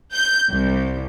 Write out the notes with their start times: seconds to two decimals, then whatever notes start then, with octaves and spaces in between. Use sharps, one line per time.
0.13 G6
0.51 C2